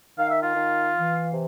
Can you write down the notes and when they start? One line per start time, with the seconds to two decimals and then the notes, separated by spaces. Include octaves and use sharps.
0.18 D#3 F5
0.30 E5
0.43 F4 F5
0.56 D#3
0.94 E3
1.33 C3